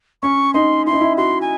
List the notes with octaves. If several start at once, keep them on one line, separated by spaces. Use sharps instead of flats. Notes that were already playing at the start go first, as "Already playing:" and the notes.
C#4 C#6
D#4 C6
E4 C6
D#4
E4
F#4 C6
G#5